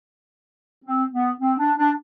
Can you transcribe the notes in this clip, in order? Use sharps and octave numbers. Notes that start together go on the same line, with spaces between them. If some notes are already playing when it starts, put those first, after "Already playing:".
C4
B3
C4
D4
D4